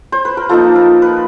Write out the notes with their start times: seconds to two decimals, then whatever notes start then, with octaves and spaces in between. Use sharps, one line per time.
0.12 C5
0.25 B4
0.37 A#4
0.49 F3 A#3 D#4 A4
0.76 A#4
1.02 B4